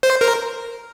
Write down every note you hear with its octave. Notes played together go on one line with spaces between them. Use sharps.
C5
A#4